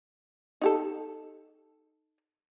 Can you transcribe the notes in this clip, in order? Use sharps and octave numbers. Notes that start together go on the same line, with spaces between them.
D#4 G4 A4